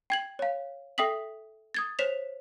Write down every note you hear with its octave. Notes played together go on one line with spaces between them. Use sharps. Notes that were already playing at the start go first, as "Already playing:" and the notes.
G5 G#6 F#7
C#5 F5
A4 E5 G5 D#6 B6 F#7
D#6 G#6 A6
C5 C#5 B6 E7 F7